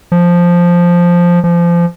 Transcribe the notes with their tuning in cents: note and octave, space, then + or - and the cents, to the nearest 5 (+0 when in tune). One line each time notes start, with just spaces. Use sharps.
F3 +0
F3 -25